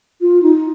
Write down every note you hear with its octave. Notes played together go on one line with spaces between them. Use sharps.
F4
D#4